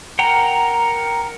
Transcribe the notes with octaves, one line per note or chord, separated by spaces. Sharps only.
A#4 F#5 G5 A#5